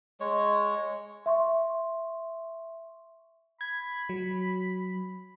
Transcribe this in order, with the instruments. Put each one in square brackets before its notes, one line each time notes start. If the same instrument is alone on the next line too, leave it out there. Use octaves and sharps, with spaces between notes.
[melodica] G#3 C#5
[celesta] E5 C6 C#6
[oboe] B5 [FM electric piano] G#6
[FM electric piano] F#3